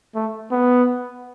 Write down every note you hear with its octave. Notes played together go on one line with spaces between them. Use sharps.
A3
B3